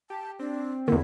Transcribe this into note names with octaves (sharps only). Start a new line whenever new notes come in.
G4 A5
C4 D4
E2 D3 A#3 E4